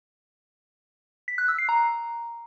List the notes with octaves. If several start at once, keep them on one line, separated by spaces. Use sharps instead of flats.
B6
F#6
E6
C7
A#5